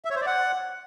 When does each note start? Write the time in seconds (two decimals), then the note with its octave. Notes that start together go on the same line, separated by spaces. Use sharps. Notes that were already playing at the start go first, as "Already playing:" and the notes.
0.05 E5
0.10 C#5
0.16 C5
0.21 D5
0.26 F#5